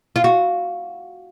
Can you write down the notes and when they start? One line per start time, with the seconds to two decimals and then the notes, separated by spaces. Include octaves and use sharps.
0.16 F4
0.24 F#4